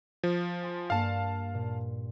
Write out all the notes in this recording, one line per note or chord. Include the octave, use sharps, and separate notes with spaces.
F3
G#5 C6 A6
G2 A#3 F5 A5 C#7
A#2